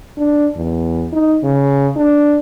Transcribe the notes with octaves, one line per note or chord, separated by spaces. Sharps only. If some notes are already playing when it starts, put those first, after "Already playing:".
D4
E2
D#4
C#3
D4